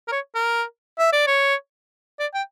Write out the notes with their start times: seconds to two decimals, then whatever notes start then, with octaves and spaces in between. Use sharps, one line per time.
0.08 A#4
0.12 C#5
0.35 A#4
0.99 E5
1.13 D5
1.27 C#5
2.20 D5
2.34 G5